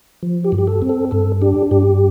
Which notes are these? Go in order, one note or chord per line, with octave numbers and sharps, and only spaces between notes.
F3
G4
G2
G4
A4
C4
A4
G2 A4
D4 G4
G2 G4